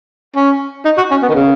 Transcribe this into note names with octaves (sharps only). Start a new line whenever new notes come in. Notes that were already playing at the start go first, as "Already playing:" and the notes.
C#4
D#4
F#4
C#4
B3
D#3
C#3